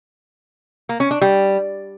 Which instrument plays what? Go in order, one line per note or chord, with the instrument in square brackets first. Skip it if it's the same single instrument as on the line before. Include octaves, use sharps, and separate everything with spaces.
[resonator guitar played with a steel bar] A#3
C#4
D4
G3